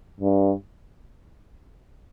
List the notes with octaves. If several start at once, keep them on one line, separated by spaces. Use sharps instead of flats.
G2